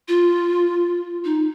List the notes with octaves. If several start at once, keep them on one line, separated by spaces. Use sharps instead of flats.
F4
D#4